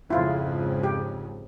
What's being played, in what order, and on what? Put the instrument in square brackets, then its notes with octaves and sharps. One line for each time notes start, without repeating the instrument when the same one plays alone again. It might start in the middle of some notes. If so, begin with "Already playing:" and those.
[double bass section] F2 G#2 C#3 [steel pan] E4 F4
[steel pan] G4